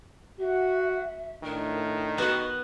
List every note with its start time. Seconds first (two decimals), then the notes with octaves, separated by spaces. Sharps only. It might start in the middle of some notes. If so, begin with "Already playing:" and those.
0.39 F#4 E5
1.43 A2 D#3 D4 A#4
2.18 B3 F#4 F#5